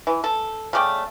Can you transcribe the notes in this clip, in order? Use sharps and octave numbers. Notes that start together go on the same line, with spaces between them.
E3
A4
C#3 A3 D5 G5